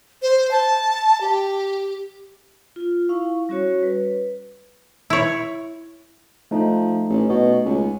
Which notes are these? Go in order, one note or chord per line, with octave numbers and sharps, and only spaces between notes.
C5
A5
G4
F4
E4 F5 C#6
G3 C#4 F#4 C#5
B4
E4 C#5
F3 A3 D#4
A1
B2
C#2